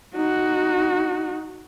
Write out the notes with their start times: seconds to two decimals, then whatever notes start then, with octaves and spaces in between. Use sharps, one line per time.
0.16 D#4 F#4